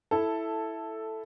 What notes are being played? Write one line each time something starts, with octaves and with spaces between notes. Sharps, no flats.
E4 A4